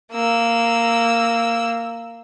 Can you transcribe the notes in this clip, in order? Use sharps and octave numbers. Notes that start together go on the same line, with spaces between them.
A#3 E6